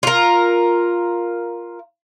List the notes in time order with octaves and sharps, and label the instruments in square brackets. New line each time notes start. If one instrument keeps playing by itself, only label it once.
[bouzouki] F4 A#4